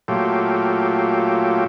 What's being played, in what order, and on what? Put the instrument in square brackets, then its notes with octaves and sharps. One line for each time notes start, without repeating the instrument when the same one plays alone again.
[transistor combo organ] A#2 F#3 A3 F4 G4